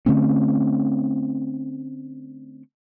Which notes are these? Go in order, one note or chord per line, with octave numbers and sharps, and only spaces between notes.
D3 A3 C4 C#4